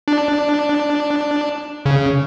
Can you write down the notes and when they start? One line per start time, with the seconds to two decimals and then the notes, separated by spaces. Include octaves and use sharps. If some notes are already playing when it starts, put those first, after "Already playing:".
0.08 D4
1.86 C#3